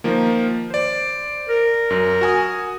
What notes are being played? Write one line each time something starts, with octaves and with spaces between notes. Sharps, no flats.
D#3 F3 A#3
C5 D5
A#4
F#2
F#4 G#5 D#6